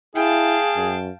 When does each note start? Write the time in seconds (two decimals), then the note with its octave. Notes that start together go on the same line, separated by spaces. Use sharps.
0.15 E4 G#4 F5 G5 A5
0.76 F#2